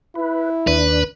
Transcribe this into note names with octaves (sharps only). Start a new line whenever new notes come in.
E4 B4
D#2 D4 B4